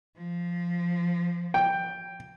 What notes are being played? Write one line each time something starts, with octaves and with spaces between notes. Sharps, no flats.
F3
G5